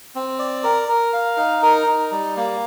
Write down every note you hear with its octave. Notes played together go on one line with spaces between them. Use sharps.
C4
D5
A#4
A#4
F5
D#4
A#4
D#4
G3
A#3